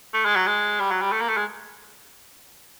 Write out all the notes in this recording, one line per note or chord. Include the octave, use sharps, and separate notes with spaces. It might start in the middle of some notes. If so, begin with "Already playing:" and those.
A3
G#3
F#3
G#3
G3
F#3
G3
A3
A#3
A3
G#3